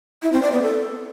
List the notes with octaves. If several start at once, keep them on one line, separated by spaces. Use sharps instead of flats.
E4
C4
D5
B3
A4